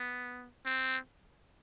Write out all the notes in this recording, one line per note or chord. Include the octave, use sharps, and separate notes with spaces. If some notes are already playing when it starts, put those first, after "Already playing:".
Already playing: B3
C4